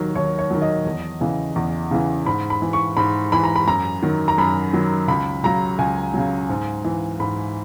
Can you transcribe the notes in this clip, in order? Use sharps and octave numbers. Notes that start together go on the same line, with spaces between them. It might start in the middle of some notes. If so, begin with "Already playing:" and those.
Already playing: D#2 D#3 F#3
D#2 C#5
C#5
D#3 F#3
D#5
E2
C#3 E3
E2
C#3 E3
G#2 B5
B5
E3
C#6
G#2 B5
E3 B5
A#5
B5
F#2 A#5
D#3 F#3
A#5
F#2 B5
D#3 F#3
C#2 B5
C#3 F#3 A#5
C#2 G#5
C#3 F#3
G#2
E3
G#2 B5